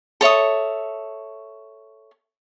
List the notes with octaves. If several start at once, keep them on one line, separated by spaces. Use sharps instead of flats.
A4 C#5 E5 D#6